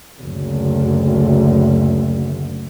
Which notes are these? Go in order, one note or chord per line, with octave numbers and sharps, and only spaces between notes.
F#1 D2